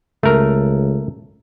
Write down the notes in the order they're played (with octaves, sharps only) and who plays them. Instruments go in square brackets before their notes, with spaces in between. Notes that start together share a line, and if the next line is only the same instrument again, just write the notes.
[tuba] C#2 [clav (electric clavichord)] A3 A#4